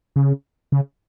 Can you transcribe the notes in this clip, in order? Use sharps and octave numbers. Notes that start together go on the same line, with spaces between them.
C#3
C#3